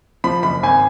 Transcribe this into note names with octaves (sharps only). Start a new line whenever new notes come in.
F3 B5
F#1 B5
G#1 G#5